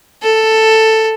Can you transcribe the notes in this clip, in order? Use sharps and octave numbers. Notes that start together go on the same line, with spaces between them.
A4